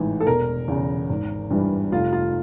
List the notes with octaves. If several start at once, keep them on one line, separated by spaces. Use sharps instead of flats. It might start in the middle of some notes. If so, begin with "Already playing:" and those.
Already playing: A1 G#2 E3
A4
E1 A#4
E2 C#3
G#1
G2 E3 G3
F1 F4
F4